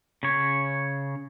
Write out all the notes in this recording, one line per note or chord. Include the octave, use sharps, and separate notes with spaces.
C#3 C#5